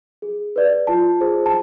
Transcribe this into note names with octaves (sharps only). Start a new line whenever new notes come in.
G#4
B4 D5
F4 A5
G#4 C5
A5